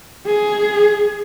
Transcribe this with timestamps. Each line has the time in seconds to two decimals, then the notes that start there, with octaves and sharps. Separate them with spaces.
0.26 G#4